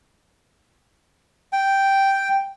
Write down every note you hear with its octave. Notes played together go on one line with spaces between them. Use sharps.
G5